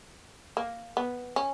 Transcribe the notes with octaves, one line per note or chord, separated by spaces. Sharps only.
A#3
B3
C#4